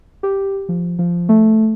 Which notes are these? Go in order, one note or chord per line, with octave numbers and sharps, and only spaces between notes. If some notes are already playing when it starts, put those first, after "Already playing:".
G4
F3
F3
A3